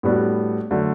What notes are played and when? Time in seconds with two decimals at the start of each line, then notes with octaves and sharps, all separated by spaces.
0.03 A2 G3 B3 D4 F#4
0.71 D3 F#3 A3